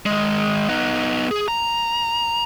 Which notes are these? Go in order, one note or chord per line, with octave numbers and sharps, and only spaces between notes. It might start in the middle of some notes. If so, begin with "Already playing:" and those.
D#3 G#3
B3 D#4
G#4
A#5